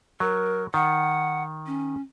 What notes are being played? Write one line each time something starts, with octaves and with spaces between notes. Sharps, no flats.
F#3 A#4
D#3 F#5
C#4